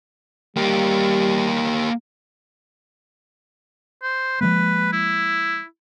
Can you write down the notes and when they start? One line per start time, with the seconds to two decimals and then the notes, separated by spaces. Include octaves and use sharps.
0.57 G3 A#3 G4
4.02 C5
4.41 F3 G#3 A#3 B4
4.93 E4